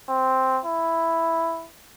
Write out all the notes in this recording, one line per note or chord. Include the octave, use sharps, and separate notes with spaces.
C4
E4